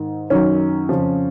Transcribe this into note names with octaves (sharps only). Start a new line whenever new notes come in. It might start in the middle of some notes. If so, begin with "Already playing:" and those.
Already playing: G#2 D#3
F#2 D#3 C#4
F2 C#3 F3